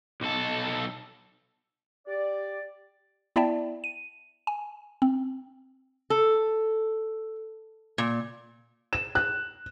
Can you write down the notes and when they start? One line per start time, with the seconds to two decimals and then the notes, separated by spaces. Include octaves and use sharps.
0.21 B1 A4
2.08 G4 D5
3.36 B3 E4 D5 E5 G5 A5
3.84 D#7
4.47 G#5
5.02 C4
6.10 A4
7.98 A#2
8.93 E7
9.15 F#6